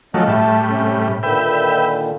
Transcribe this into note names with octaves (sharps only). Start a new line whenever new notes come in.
F3 F#3 A3 C#4 D#5
A2 G3 A3 A5
C3 C#4
A#2 D3 D#3 B4 E5 G5